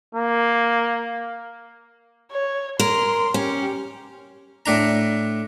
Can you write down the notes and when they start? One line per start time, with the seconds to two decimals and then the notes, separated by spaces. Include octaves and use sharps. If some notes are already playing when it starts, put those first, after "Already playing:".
0.15 A#3
2.31 C#5
2.79 A#4 C6
3.34 C#4 G4
4.66 A2 D4 A#5